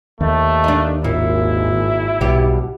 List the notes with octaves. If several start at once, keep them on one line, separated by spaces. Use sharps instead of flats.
D#2 A3
D4 D#4
G#1 A#2 E4
B1 B2 G3 G4